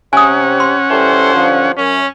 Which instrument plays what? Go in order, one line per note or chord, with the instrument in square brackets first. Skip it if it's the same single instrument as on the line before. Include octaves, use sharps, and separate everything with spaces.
[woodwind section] C3 [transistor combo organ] C#4 F#5 [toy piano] G#5 D#6
[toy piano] C6
[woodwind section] E3 G3 A4 [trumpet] C5
[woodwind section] G2 D3 F3
[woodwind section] F#2 [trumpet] C#4